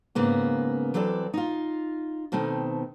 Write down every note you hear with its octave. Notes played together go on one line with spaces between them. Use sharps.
G#2 C#3 A#3 B3
E3 F#3 C4 A4 D5
D#4 F4
B2 D#3 A3 C4